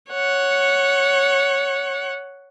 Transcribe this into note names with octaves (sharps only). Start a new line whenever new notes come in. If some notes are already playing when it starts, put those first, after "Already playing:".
C#5 F#5